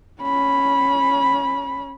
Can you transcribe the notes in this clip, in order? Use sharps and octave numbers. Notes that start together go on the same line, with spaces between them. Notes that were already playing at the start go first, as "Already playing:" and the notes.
C#4 B5